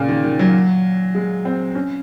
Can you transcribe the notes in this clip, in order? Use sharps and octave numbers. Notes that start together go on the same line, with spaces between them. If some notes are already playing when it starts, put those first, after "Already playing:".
Already playing: A#2 C#3
D#3
D#3
F#3
G#3
C4
C#4